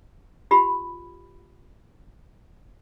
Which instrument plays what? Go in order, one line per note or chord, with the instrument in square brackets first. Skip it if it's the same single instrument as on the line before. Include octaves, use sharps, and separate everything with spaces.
[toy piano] F4 G4 B5